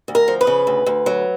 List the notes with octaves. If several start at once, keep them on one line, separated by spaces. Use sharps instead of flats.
D2
A#4
F3
B4
C#3
D2
D2
F#3